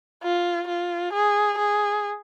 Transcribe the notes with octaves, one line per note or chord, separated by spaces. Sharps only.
F4
F4
G#4
G#4